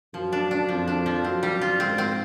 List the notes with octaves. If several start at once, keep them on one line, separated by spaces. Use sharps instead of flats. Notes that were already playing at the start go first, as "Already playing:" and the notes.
F#2 F3
D4
D4
F2 F3
D4
F3
F#2 C4
G3
F4
G#2 C4
C4